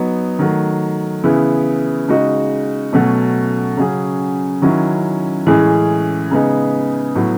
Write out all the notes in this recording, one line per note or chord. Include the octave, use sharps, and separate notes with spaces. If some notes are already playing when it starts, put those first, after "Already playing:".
Already playing: F#3 B3 D#4
D#3 F#3 A3
C#3 E3 B3 E4 G#4
C#3 G#3 D#4 F#4
B2 F#3 A3 C#4
C#3 F#3 C#4 G#4
D#3 F#3 C#4 E4
A2 E3 G#3 C#4 G#4
C#3 G#3 B3 D#4 G#4
A2 F#3 B3